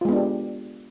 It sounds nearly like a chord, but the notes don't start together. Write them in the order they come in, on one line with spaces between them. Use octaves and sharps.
F4 G#3 B3 D4 G4